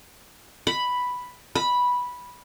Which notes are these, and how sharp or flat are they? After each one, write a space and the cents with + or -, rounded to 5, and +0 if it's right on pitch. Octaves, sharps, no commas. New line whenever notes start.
B5 +0
B5 -10